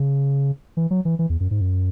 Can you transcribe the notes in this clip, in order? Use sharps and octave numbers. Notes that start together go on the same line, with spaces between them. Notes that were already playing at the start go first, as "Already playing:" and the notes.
Already playing: C#3
E3
F#3
E3
E3
E2
F#2
G#2
F#2